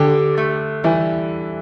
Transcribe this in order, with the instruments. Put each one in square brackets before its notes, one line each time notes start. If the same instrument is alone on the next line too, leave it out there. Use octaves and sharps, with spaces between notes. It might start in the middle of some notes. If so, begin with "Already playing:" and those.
Already playing: [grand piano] D3 [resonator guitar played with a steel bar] G4
[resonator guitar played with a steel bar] A3
[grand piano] E3 [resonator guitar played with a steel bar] G3